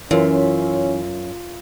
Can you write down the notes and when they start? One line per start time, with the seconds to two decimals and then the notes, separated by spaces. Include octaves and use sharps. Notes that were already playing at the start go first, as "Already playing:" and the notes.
0.11 F#2 E3 C#4 F4 E5